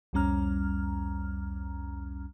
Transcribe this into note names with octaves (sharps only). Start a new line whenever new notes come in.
C2 F2 G3 C#4 A#5 F6